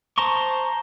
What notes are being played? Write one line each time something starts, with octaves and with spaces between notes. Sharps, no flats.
C5 A5 A#5 C6 C#6